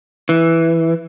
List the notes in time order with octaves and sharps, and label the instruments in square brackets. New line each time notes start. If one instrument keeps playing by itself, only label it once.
[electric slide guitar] E3